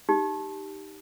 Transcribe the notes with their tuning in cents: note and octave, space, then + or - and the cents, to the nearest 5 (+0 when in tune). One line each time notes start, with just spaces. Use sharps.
D#4 +0 G4 +0